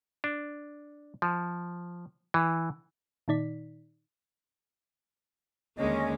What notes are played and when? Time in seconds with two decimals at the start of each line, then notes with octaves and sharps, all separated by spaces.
0.24 D4
1.22 F3
2.34 E3
3.28 A#2 D#3 D#4 D5 B6
5.77 D#2 D3 G#3 A#3 C#4 D#5